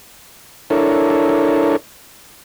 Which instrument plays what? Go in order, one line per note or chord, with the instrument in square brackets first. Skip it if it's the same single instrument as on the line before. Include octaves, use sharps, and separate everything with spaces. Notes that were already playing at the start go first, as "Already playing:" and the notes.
[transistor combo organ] D4 E4 A4 A#4 C#5